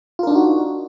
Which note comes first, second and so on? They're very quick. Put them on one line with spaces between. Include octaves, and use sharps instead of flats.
F4 A#4 D4 D#4 F#4